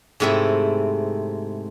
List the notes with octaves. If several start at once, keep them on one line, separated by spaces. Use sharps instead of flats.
G#2 C3 A3 C4 E4